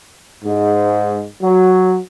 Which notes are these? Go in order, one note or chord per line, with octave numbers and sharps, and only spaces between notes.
G#2
F#3